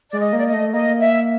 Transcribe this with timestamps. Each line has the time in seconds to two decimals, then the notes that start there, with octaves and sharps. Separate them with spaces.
0.10 G#3 D5
0.19 D#5
0.33 A#3
0.38 D5
0.46 D#5
0.53 A3
0.73 A#3 D#5
1.00 E5